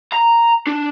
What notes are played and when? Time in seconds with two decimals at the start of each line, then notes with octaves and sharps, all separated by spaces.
0.12 A#5
0.67 D4